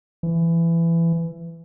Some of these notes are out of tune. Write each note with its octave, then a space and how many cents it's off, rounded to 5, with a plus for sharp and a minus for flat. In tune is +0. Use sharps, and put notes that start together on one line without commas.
E3 +20